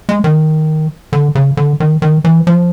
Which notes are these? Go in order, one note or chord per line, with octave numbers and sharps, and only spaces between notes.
G#3
D#3
D3
C#3
D3
D#3
D#3
E3
F3